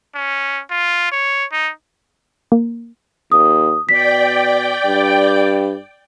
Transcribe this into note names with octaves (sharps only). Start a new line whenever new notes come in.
C#4
F4
C#5
D#4
A#3
D#2 D#6
B2 D5 G5 B6
G2